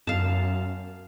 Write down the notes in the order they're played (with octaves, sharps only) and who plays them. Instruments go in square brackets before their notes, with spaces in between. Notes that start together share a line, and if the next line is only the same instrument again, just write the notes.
[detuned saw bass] F#2 [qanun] F5 A5